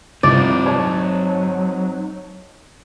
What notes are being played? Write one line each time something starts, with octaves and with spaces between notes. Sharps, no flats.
C2 C3 F3 C4 D#4 D5
F#3 C#5 A5